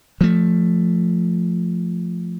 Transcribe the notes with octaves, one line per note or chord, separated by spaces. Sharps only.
F3 A3